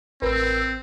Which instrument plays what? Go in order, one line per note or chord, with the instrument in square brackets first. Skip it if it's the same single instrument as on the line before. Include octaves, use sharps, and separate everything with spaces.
[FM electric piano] A1 E6 [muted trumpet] C4 [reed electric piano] A#4 B4